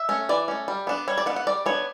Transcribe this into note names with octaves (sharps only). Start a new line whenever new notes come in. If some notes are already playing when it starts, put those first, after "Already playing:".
Already playing: E5
A3 C#4
E3 D5
A3 C#4
G3
B3 D4
G3 C#5
D5
B3 D4 F#5
F#5
G3 D5
B3 D4 C#5